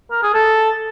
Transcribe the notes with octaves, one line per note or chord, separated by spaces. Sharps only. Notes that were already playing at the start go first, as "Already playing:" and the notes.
A#4
G#4
A4